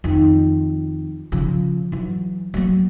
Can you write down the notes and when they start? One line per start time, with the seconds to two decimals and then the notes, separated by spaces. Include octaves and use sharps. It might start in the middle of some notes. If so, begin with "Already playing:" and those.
0.04 F2 D#3
1.32 C#3 F3
1.92 E3 F#3
2.54 F#3 A#3